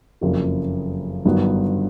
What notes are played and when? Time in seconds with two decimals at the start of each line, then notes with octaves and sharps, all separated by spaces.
0.21 F#1 F2 C#3 F#3 A#3
1.25 G1 G2 D#3 F#3 B3